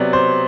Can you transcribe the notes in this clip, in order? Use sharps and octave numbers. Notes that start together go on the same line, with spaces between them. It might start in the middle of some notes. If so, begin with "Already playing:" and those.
Already playing: C3 F#3 B3 D5
C5